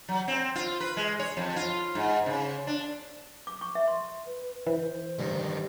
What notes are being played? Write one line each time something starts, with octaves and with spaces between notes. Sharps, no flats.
F#3
C4
F4
B4
G#3
C#5
F2
F4
G#2
C#3
D4
D6
C#6
E5
C6
B4
E3 C5
G2 D3 D#3